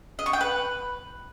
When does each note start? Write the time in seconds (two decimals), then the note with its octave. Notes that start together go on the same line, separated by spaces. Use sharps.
0.19 D#5
0.26 C#6
0.33 G5
0.41 B4